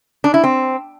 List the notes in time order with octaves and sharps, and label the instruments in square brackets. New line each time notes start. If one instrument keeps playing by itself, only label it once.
[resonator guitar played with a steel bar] D4
E4
C4